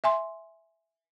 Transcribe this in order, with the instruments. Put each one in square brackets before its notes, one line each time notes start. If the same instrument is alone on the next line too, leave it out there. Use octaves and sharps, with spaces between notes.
[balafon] E5 G#5 C6